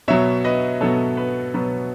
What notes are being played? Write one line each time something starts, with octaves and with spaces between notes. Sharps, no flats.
B2 F#3 B3 C#5 E5
B4 D#5
B2 F#3 B3 A4 C#5
B4
B2 F#3 B3 B4